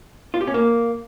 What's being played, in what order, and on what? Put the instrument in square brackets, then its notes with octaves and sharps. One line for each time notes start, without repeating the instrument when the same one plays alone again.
[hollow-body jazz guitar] F4
G4
C#4
A#3